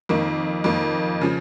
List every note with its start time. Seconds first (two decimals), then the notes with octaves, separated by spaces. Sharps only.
0.09 F2 D#3 A#3
0.64 F2 D#3 A#3
1.21 C#3 F3